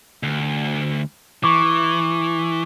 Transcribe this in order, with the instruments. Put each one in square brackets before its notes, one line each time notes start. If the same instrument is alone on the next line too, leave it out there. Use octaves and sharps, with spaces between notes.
[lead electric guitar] D2
[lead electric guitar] E3 [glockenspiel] C#6 D6